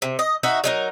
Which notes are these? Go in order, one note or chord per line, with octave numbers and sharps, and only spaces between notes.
C3
D#5
D#4 F#4 E5
F#3 D#4 A#4